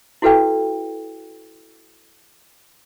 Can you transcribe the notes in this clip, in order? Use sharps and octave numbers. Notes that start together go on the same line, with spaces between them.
E4 F#4 A4 B4 F5 G5